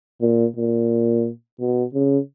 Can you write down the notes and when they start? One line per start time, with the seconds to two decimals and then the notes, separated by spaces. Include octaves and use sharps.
0.21 A#2
0.56 A#2
1.59 B2
1.94 C#3